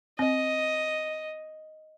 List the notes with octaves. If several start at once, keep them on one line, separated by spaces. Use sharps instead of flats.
C4 D#5